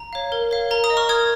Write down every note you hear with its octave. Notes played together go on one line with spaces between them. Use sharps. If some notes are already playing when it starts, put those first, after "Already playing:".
Already playing: A#5
C#5 F5
A#4
C#5 F5
A#4 A#5
A#5 D#6
D#5
C#6 F6
A#4 D#6 G#6